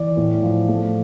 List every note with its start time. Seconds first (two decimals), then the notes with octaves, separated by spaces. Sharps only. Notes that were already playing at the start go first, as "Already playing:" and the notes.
Already playing: E3 D5
0.17 A2
0.42 F3
0.68 A3